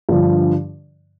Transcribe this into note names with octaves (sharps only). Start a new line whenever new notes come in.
G2 D3 F3